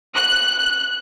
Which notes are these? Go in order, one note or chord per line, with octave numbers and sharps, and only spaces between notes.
F#6